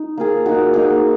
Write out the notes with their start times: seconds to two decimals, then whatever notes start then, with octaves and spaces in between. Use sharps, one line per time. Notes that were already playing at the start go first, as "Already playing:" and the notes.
Already playing: D#4
0.17 A#3 F4 G#4
0.46 A#3 D#4 F#4
0.74 A#3 D#4 F#4